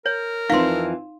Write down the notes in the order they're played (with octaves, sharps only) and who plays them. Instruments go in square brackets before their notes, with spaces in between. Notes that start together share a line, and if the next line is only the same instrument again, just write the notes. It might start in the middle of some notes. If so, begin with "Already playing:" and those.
[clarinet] A#4 [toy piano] C#5
[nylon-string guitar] F2 E3 C4 [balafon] D#4 [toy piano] F5 C6